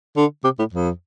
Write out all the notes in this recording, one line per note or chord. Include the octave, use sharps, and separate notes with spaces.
D3
C3
A2
F2